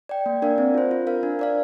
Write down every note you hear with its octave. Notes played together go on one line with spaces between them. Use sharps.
D5 G5
A#3
D4 A#4 D5 F5
C4
F4 C5
F4
A#4 F5
D4
A#4 D5 F5